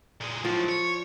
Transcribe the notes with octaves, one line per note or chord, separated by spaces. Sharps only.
A#2 G#3
A2 F3 F#3
C#5